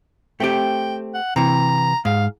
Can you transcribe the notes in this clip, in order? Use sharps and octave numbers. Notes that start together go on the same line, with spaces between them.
A3 C4 G4 G5
F#5
C3 E3 A#5
G#2 F5